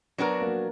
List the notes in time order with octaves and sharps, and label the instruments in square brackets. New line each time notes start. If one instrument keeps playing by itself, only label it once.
[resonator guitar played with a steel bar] F#3 D4 F#4 A#4 [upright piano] B3
[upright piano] A#3